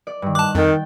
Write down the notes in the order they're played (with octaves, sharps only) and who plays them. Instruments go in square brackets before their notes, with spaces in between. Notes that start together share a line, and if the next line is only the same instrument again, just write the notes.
[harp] D5
G2 D#3
[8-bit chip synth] A5 D6 [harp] F#6
[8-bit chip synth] F2 [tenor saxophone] D#3 [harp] G5 A5